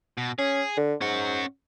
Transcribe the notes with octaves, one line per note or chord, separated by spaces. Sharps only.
B2
C#4 G#4
D3
G#2 C#4 F#5